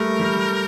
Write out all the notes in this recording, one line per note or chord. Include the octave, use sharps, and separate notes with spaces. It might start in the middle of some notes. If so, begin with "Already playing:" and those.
Already playing: G3 A3 A#4
G3